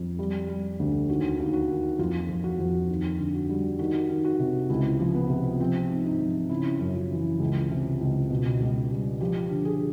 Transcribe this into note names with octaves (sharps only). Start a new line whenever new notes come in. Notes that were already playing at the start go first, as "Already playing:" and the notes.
Already playing: F2
G3
G3
D2
D#2 F#4
D#2
F#4
D#3
F2 F4
F2
F#4
F2
D#2
D3
F#4
G3
D#3 F#4
D#3
F#4
C3
C#2 E4
F3
B3
C3
F3 C4
G#2
D#4
F3
C#3 E4
F#2
F4
E3
C#2
C3
C#2
B2
C#2
G3
F3 G4
D3
G#4